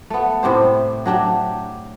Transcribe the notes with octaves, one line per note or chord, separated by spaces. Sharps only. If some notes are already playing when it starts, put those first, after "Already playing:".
A3 B3
A2 C3 G4 C5
F#3 D4 G4 E5